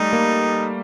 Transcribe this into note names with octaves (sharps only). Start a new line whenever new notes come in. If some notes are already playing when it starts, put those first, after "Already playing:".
Already playing: G3 A3 D#4
A#3